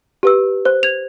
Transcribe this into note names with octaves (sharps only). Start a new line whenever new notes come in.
G4 B4 E6
C5 F#6
G#6 F7